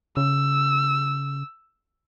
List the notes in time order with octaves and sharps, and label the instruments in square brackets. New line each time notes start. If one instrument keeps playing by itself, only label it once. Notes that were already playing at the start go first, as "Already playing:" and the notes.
[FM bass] C#3 [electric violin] E6